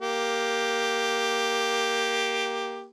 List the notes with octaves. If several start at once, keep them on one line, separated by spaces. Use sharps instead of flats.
A#3 G4